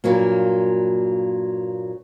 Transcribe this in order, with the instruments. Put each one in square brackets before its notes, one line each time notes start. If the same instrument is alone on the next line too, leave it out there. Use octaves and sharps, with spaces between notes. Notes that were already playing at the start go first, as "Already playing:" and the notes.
[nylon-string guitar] G2 A#2 F#3 A#3